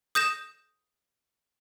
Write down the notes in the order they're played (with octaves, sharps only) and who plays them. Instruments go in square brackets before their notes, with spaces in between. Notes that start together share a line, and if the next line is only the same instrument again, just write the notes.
[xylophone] D#6 G6 A#6 E7